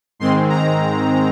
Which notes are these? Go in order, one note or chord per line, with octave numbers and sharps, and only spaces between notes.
G#2 D#3 G#3 C4 C6
A#5